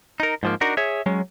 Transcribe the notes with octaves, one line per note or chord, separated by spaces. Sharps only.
D#4 A#4
G#2 F3 A#3
D4 D#4 F#4 A#4
G#4 C#5 E5
F#3 G#3 C#4